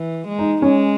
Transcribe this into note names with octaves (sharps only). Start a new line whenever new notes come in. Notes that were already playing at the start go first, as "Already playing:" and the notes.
Already playing: E3
G#3
D#4
G#3 C#4